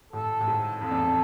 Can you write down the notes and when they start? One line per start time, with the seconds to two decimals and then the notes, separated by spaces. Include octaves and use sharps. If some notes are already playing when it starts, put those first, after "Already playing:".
0.13 A2 A4
0.41 A2
0.47 G#2
0.81 F2 A4
0.91 E2